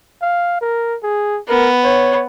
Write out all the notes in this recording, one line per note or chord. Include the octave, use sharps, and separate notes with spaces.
F5
A#4
G#4
B3 A#4
C#5